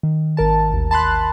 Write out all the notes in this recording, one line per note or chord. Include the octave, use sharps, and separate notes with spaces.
D#3
G#1 A#4 A5
A1 D#2
A5 B5 C6 F#6